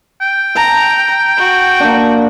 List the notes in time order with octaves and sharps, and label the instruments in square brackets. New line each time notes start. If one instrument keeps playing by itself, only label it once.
[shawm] G5
[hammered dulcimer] A5 [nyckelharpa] A#5
[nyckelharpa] F#4
[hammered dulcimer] A#3 D4